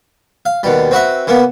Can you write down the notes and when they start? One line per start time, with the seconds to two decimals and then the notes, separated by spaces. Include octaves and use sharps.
0.46 F5
0.63 D#2 B2 G3
0.91 C4 F#4 B4 E5
1.27 C#3 A#3 B3